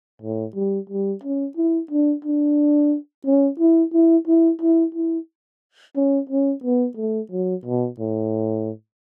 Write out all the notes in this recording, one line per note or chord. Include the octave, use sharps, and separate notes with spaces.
A2
G3
G3
C#4
E4
D4
D4
C#4
E4
E4
E4
E4
E4
C#4
C#4
B3
A3
F#3
B2
A2